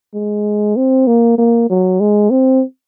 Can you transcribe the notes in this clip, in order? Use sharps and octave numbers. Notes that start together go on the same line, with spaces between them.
G#3
C4
A#3
A#3
F#3
G#3
C4